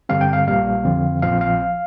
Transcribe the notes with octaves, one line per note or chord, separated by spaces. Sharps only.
G2 D3 G3 C4 F5
G5
F5
A#1 A#2 G3 A#3 F5
F2 D3 F3 C4
A#1 A#2 F3 C4 F5
F5